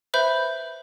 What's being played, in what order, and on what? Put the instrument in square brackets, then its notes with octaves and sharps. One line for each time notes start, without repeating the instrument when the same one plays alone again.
[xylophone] B4 C5 E5 B5 G6